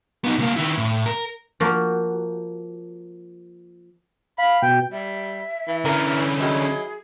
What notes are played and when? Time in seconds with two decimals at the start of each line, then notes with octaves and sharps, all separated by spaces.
0.24 B3 D#4
0.38 C2 A#3
0.56 D#3 E4
0.78 A2
1.06 A#4
1.60 F3 A#3 F#4
4.38 F5 B5
4.62 B2 G5
4.92 G3 E5
5.68 E3
5.85 D3 C#4 A#4
6.41 D#3 F#3 E4 G#4